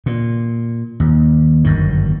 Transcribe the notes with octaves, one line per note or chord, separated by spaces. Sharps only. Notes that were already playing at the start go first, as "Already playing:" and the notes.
A#2
D#2
G1 F#2 D#3